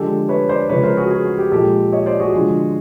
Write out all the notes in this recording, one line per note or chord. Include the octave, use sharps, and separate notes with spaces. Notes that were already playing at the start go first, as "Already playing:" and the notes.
Already playing: D3 F3 G#3 G4 A4
B4 C#5
C5 D5
C#3 F3 G#3 B4 C#5
A#4 C5
F#4 G#4
F#4 G#4
F#4
G4
A#2 F3 G#3 G4 A4
C#5 D#5
C5 D5
F#4 G#4
D3 F3 G#3